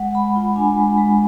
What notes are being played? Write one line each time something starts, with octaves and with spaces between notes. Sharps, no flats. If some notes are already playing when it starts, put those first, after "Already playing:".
Already playing: G#3 F#5
G#3 B5
F4
D4 G#5
G#3
G#3